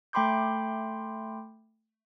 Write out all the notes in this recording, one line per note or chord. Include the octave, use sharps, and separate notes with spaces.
A3 G5 B5 C6 D6 G6